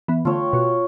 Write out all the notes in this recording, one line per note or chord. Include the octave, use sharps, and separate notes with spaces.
E3 B3
D3 A3 F4 C#5 G5
B2 F#4